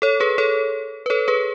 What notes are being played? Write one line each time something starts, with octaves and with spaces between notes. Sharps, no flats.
A4 C#5
G#4 B4
A4 C#5
B4
A4 C#5
G#4 B4